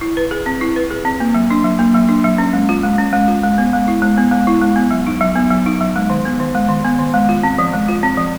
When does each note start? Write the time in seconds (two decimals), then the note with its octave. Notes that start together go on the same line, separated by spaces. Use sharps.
0.01 E4
0.17 B4
0.31 G#4
0.46 C4
0.61 E4
0.76 B4
0.91 G#4
1.05 C4
1.20 A#3
1.34 F#3
1.51 D4
1.64 F#3
1.79 A#3
1.94 F#3
2.09 D4
2.24 F#3
2.38 C#4
2.53 G#3
2.69 F4
2.84 G#3
2.98 C#4
3.13 G#3
3.28 F4
3.43 G#3
3.58 B3
3.73 G#3
3.88 E4
4.02 G#3
4.18 B3
4.31 G#3
4.47 E4
4.62 G#3
4.76 B3
4.91 F#3
5.07 D#4
5.21 F#3
5.35 B3
5.50 F#3
5.66 D#4
5.81 F#3
5.96 G#3
6.10 D#3
6.25 B3
6.40 D#3
6.55 G#3
6.69 D#3
6.85 B3
6.99 D#3
7.14 G#3
7.29 F4
7.43 C4
7.58 F3
7.74 G#3
7.89 F4
8.03 C4
8.17 F3